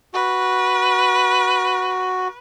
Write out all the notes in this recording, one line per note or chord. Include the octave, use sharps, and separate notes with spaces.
F#4 B4